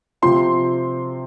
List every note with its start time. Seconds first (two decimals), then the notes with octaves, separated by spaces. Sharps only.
0.22 C3 F3 C4 F4 C6